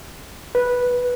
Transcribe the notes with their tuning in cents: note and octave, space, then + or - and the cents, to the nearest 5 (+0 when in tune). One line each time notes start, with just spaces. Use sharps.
B4 -10